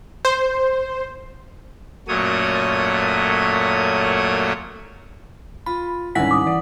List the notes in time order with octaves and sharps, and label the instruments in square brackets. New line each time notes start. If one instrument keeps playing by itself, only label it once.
[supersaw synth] C5
[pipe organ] F#2 A#2 F#3 A3 C#5 D#6
[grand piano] F4 [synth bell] B5
[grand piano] C2 D#3 G#5 [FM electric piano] G#2 C#4 [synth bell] E4 F#5 B6
[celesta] D6 D#6
[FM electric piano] E3 [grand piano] D5